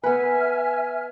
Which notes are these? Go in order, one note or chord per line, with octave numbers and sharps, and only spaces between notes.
B3 B4 E5 G#5 F6